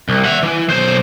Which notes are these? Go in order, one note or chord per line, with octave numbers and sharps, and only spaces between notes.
C2
E5 F#5
E3
B1 C5